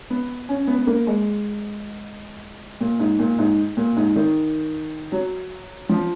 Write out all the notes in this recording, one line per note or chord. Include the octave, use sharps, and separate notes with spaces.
B3
C#4
B3
B3
A#3
G#3
A#2
G#2
A#2
G#2
A#2
G#2
D#3
F#3
F3